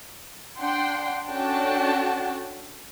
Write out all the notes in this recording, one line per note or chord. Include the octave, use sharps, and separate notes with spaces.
D4 F#5 G5 C6
C#4 D4 F#4 A4 G5 A5